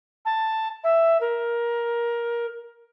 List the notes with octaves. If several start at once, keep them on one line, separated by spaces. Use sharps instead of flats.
A5
E5
A#4